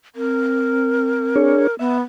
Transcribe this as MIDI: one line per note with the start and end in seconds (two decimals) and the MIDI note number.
0.16 1.53 60
0.16 1.75 70
1.36 1.67 62
1.36 1.67 68
1.36 1.67 73
1.79 2.01 59
1.79 1.97 76